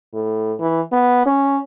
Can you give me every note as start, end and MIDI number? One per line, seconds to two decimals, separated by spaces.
0.14 0.53 45
0.60 0.81 52
0.92 1.23 59
1.26 1.61 61